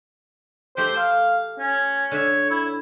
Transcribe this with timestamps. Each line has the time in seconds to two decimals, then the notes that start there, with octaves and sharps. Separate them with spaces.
0.77 A3 G4 C5 G5
0.97 F5
1.59 C#4
2.11 D3 C#5 E5
2.50 E4